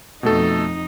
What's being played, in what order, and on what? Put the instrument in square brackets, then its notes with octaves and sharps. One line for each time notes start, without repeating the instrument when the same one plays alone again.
[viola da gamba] F2 D#4 [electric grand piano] B2 A3 A4